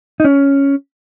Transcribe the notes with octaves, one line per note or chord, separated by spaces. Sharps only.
D#4
C#4